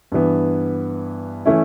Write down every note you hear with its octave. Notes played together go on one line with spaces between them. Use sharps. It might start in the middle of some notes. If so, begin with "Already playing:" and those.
G2 E3 B3
E3 A3 C#4 E4